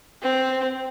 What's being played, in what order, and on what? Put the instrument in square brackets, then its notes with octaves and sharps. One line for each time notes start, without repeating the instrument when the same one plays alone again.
[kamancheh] C4